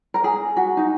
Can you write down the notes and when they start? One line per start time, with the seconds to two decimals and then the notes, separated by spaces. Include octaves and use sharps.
0.14 A#4
0.24 G#4
0.57 F#4
0.77 D#4